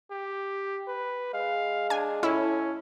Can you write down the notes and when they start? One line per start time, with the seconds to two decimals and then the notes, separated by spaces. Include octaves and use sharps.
0.11 G4
0.88 B4
1.33 G#3 F5
1.90 D4 G#5
2.23 A2 C#4 E4